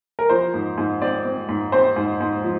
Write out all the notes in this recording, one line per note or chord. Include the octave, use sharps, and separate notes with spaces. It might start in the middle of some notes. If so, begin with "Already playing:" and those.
A#4
F3 C5
G#2
G#2
C4 D5
C4
G#2
C4 C5
G#2
G#2
F3